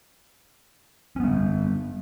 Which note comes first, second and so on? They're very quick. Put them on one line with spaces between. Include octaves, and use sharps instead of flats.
C#4 B3 G3